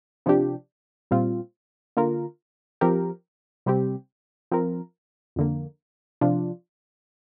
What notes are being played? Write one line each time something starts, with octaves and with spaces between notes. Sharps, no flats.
C3 F3 D4 G4
A#2 G3 C4 F4
D3 A#3 F4 A#4
F3 C4 G4 A#4
C3 G3 C4 G4
F3 C4 A#4
F2 D3 A#3
C3 F3 D4 F4